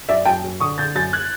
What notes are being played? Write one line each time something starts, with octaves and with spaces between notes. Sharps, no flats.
F#2 D5 E5
F#2 G5 A5
F#2
D3 C#6 D#6
D3 G6 A6
F#2 G6 A6
F#6 G#6